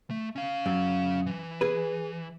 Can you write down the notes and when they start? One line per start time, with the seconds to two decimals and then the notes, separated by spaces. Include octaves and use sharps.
0.10 A3
0.36 C#4 F5
0.66 F#2
1.26 E3
1.61 G#4 B4